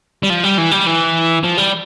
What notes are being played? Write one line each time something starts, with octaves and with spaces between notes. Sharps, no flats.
G3
F3
G3
E3
G3
E3
F3
G3